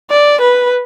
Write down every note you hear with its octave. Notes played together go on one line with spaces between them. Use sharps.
D5
B4